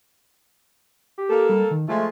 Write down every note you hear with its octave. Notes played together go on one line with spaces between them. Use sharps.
G4
A#3 A4
G3
D#3
F3 G#3 A3 F4